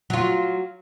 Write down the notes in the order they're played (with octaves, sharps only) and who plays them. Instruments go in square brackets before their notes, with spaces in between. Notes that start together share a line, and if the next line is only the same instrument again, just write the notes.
[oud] F#3 F4